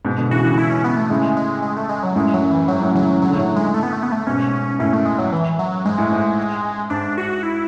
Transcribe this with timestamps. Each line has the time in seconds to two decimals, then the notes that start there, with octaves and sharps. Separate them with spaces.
0.05 G#2 B2
0.18 B2 D3
0.31 C#3 E3 F#4
0.44 C#3 E3
0.58 E4
0.70 C#4
0.84 B3
0.97 A3
1.10 A2 C#3 G#3
1.37 G#3
1.62 G#3
1.76 A3
1.89 G#3
2.03 F#3
2.16 F#2 A2 G#3
2.34 F#3
2.41 F#2
2.51 E3
2.68 G#2 F#3
2.81 F#2 A2
2.95 C#3 E3 F#3
3.21 C#3 F#3
3.28 D3
3.36 A2 C#3 F#3
3.56 G#3
3.74 A3
3.83 B3
3.93 A3
4.03 B3
4.12 A3
4.27 G#2 B2 C#4
4.79 F#2 A2 C#4
4.93 A3
5.05 G#3
5.19 F#3
5.32 E3
5.59 F#3
5.85 G#2 G#3
5.98 A2
6.11 G#2
6.90 G#2 D4
7.18 F#4
7.43 E4